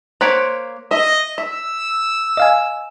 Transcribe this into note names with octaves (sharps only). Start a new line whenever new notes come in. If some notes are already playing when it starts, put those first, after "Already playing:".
A#3 C5 C#5 F#6 B6 D7
D#5 E5
E5 E6
D#5 F5 G#5